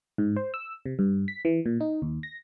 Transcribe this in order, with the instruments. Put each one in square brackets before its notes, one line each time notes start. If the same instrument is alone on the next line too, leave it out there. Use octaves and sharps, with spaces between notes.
[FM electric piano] G#2
C5
E6
C3
G2
B6
E3
A#2
D#4
D#2
A#6